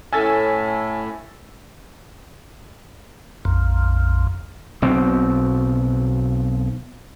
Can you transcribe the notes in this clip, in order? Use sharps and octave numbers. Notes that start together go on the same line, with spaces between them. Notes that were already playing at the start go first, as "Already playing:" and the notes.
A2 C#4 A4 E5 G#5 E6 A6
A#1 F2
B1 B2 C4